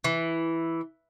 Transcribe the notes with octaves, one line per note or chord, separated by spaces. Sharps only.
E3